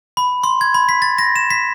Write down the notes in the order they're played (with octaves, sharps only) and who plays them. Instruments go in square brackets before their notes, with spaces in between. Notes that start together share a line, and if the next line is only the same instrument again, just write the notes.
[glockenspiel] B5
C6
G#6
B5
B6
A6
A#6
E7
B6